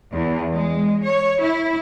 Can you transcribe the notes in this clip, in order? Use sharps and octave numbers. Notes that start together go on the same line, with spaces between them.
E2
G#3
C#5
E4